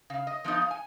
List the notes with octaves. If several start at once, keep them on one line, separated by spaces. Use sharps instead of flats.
C#3 F5
D#5
F3 B3 D#4 D#5
F5
G#5